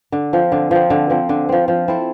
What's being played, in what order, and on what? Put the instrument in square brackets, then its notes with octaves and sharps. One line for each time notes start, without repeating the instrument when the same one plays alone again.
[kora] D3
F3 C4
D3
F3 C4
D3
F3 C4
D3
F3 C4
F3
C4 E4 A4